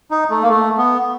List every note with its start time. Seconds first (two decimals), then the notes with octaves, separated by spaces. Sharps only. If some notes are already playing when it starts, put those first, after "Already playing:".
0.11 D#4
0.30 A3
0.42 A#3
0.49 A3
0.78 B3